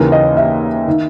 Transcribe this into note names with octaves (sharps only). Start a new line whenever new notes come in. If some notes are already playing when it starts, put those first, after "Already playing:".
Already playing: D#2 C#3 E3 A#4
D#5
E5
D#3